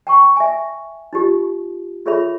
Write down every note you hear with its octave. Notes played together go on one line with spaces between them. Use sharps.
G5 A5 C#6
E5 G#5
D#4 F4 G4
F4 G#4 A4 C#5 E5 B5